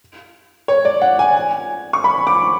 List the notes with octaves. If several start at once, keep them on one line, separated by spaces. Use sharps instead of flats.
C#5
D5
F#5
G#5
G#5
C#6
B5
D6